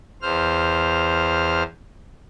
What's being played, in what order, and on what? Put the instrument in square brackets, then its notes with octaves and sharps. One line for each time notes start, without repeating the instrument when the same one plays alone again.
[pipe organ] E2 C5 F6